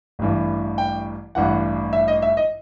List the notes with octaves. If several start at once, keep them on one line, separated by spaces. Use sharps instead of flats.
A1 G2 E3
G5
A1 G2 E3 F#5
E5
D#5
E5
D#5